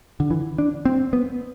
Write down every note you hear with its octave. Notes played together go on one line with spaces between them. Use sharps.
D3
E3
D4
C4
B3